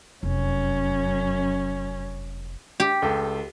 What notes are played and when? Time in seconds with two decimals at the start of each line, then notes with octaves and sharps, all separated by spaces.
0.23 F1 F#2 C#4
2.80 G4
3.02 C#2 A4